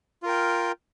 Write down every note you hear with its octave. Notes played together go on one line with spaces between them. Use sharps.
F4 A#4 G5